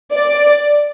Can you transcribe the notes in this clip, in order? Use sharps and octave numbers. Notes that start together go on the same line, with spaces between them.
D5